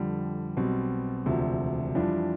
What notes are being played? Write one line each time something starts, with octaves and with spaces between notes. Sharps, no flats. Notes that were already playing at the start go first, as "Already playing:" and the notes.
Already playing: F2 D3 G3
B1 B2 G3 C4
E1 D2 C3 F3
F2 E3 G3 D4 F4